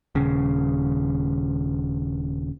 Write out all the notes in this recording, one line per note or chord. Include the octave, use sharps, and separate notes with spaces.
D#1 C#3